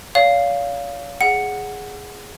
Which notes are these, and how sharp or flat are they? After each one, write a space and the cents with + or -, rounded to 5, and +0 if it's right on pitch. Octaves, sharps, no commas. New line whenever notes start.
C#5 +45 F5 +0
G#4 +0 F#5 +0